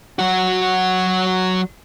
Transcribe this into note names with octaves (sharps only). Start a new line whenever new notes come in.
F#3 F#4